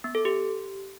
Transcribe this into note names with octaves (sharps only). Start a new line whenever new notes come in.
B3
A4
G4